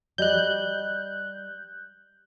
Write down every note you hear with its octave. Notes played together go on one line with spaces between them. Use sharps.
G3 D5 D#5 F#6 G6